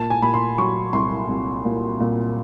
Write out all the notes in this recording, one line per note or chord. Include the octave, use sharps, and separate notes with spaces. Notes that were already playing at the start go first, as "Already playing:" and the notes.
Already playing: A#2 A5
G#5
A#2 B5
C6
F#3 C#6
C2 C6
C2
A#2
A#2